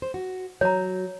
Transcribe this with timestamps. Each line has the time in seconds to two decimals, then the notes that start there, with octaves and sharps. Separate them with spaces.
0.02 C5
0.14 F#4
0.61 F#3 C#5 A#5